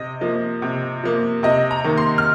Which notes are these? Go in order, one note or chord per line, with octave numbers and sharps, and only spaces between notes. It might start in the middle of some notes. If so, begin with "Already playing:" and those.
Already playing: C3 D#5
F3 A#3
C3
F3 A#3
C3 D#5
A#5
D#3 A#3
C6
F6